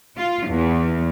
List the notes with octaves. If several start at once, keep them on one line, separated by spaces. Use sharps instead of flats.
F4
E2